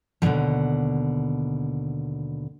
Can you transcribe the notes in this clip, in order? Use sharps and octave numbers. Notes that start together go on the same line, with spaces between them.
D#2 B2 D3 D#3 F3